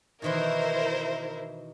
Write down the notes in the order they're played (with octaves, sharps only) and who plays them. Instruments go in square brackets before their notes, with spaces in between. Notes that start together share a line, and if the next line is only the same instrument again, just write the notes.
[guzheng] B2 D#3 E3 [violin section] E4 A#4 C5